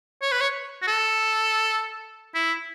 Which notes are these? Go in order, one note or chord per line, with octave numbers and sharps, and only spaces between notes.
C#5
B4
C#5
F#4
A4
E4